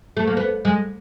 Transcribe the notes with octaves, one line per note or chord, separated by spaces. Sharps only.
A3
A#3
B3
G#3